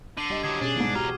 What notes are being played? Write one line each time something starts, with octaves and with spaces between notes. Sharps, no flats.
D3 C7 D#7
G3 G4 D#5
D3 F#3 D6 D#6 G#6
B2 C#4 D4 G#4
C2 G#2
E2 F#4 G4 A#5 F6